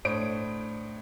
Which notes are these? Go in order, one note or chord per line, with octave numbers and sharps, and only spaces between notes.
A2 D4 C5 C#5 D#6 D7